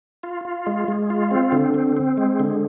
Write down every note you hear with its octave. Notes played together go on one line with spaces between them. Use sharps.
F4
F4
G#3
G#3
F4
C4
D3
C4
C4
G#3
D3